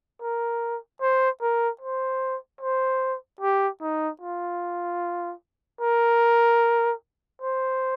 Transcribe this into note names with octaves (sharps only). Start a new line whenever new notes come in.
A#4
C5
A#4
C5
C5
G4
D#4
F4
A#4
C5